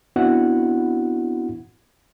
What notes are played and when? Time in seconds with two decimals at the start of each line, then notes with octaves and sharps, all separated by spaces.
0.16 B3 C4 D4 E4 F#4 F#5